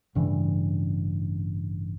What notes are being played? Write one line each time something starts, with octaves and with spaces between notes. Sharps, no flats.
A1 G2 C#3 E3